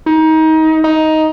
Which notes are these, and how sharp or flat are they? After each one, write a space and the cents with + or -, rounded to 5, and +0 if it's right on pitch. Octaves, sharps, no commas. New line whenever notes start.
D#4 +25
D#4 +10